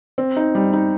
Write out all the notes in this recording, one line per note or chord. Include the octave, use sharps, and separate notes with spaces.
C4
D#4
G3
D#4